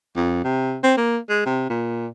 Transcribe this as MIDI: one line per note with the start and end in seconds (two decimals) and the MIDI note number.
0.16 0.43 41
0.44 0.78 48
0.83 0.93 60
0.97 1.17 58
1.29 1.45 56
1.46 1.66 48
1.69 2.07 46